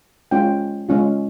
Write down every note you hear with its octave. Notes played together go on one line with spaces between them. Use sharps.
G#3 C#4 F4 G5
G#3 C#4 F4